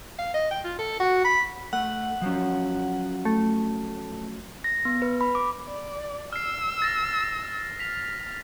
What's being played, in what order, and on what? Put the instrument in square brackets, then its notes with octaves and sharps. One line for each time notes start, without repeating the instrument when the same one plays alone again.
[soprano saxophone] F5
D#5
G5
F4
A4
F#4
B5
[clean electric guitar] A3 [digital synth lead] F#5
[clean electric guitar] F3 F#3 C#4
[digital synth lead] A3
[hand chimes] A#6
B3
B4
B5
D6
[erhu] D5
[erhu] E6 [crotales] F6 C7
[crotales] A6 A#6
[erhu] F6 [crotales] B6 F7